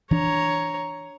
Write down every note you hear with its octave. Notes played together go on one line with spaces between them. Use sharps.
E3 D4 C#5 A#5